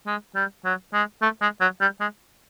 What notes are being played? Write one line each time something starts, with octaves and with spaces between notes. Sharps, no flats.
G#3
G3
F#3
G#3
A3
G#3
F#3
G3
G#3